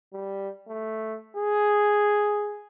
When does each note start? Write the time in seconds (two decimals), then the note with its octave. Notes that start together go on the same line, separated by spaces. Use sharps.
0.13 G3
0.68 A3
1.37 G#4